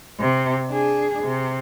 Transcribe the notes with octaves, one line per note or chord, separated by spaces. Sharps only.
C3
D4 G#4
C3